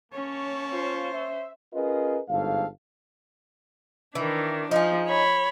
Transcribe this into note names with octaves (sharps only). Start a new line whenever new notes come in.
A#3 C#4 C#5 A5 C#6
F4 C5
E5
C#4 F4 G#4 A#4 B4 D#5
G1 G#2 A4 F5
D#3 E3 D4
F3 D#4 G#4
C#5 B5